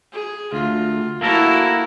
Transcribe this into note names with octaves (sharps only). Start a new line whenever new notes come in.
G#4
D2 F4
A#3 E4 F#4 A4 A#4